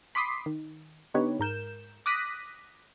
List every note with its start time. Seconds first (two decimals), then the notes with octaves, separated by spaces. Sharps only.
0.15 B5 C6 D6 D#6 B6 C7
0.46 D#3
1.14 D3 B3 D#4 G4 B4 C#5
1.39 G#2 A#4 G6 E7
2.06 D6 D#6 F#6 A#6 B6 D#7